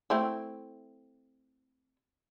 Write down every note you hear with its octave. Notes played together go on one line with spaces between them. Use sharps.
A3 C4 E4